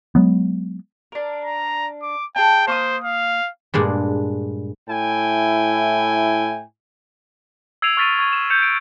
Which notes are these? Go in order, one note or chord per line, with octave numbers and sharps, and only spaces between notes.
F#3 G#3 B3
D4 A#4
A#5
D6
G#4 G5 A5
A#3 C5 C#6 D#6
F5
G2 A#2 G#3 D4
A2 E4 G5 G#5
E6 G#6 C7 D7 D#7 F7
C#6 F6 A6 B6 D7 D#7
C#6 G#6 D#7
E7
G6 C#7 E7 F7
D7